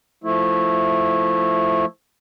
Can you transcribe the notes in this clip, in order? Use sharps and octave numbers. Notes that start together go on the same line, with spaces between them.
F3 A3 E4